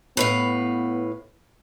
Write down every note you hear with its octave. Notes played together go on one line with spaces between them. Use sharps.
A2 B3 B4 F5